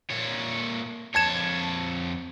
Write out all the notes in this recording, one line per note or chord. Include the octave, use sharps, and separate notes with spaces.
A#2 C#5
F2 C#5 A5 G#6 E7